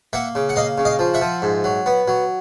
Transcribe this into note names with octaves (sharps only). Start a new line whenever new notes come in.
A#3 E5 F#5
C#3
F#5
A#3 D#5 F5
C#3
D#5 F5
F3
E5 F#5
F3
G#2
F#3
B3
F#3